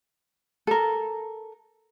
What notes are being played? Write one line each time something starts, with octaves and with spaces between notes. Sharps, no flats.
A4 A#4